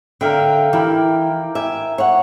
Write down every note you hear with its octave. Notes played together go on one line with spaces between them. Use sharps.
D3 A#4 E5 F5 G5
E3 G4 A#4 B5
E5 G#5 D6
C#5 F#5